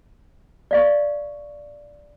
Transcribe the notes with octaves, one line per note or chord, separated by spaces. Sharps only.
D5 F5 C#6